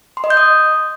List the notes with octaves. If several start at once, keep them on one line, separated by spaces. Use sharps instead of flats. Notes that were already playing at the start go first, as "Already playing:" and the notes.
C6
D#5
G6
D#6